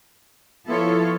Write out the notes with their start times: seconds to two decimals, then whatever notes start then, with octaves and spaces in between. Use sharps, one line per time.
0.67 F3 B3 E4 F4 A4 C#5